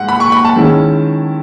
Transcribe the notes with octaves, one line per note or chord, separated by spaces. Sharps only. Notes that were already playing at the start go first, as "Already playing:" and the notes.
Already playing: G#2 F#5
B5
C#6
B5
A5
D#3 G#3 C#4 E4